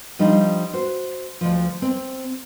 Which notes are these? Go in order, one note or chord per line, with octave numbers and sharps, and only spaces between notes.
F3 G3 D4 D#4
F#4 C5
D2 F3
C4